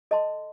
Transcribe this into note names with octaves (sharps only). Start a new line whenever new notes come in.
A4 D#5 A5 C6